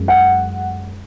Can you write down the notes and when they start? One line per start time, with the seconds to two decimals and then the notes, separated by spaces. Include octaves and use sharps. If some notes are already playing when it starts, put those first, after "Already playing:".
Already playing: F#2 G#3
0.08 F#5